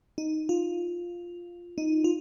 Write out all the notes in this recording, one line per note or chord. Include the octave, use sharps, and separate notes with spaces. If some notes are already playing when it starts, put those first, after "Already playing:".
D#4
F4
D#4
F4